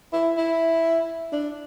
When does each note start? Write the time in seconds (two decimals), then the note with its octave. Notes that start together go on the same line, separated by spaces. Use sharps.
0.13 E4
0.37 E4
1.32 D4